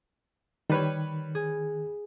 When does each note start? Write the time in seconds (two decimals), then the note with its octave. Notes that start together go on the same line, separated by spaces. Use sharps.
0.70 D#3 G3 B4 C#5
1.35 G#4